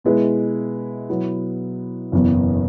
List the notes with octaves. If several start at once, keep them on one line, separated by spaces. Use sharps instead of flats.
B2 G#3 E4 B4
B2 F#3 B3 E4
F#1 E2 B2